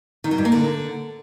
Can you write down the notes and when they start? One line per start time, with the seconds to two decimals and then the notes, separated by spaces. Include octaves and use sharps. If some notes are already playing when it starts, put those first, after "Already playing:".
0.24 D#3
0.31 F#3
0.38 G2
0.45 A#3
0.52 D3